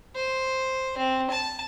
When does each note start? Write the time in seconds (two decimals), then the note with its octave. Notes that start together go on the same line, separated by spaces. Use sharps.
0.15 C5
0.98 C4
1.31 A5